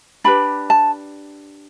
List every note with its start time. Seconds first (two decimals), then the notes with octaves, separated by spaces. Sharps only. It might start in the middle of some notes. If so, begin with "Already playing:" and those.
0.24 D4 G4 B4 B5
0.70 A5